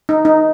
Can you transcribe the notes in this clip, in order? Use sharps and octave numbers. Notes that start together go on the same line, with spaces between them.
D#4
D#4